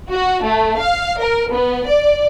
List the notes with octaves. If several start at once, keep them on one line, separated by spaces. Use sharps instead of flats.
F#4
A3
F5
A#4
B3
D5